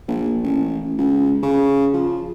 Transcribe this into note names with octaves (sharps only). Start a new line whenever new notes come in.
A#1
A1
C#2
C#3
F3